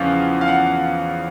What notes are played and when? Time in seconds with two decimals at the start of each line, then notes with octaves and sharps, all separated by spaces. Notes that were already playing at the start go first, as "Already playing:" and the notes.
Already playing: E2 C#3 F3 C#4 F5
0.41 F5
0.48 F#5